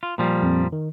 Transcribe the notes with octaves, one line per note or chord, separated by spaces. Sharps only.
F4
A#2 F3 G3
F2 C4
D#3